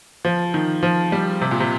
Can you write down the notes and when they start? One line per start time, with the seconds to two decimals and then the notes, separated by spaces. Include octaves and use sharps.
0.25 F3
0.54 D#3
0.83 F3
1.12 G3
1.41 C3
1.51 A#2
1.60 C3